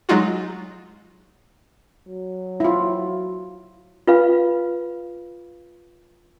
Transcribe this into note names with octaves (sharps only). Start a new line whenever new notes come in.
F#3 G#3 D#4 F4 F#4
F#3
E4 F4
F4 B4 F5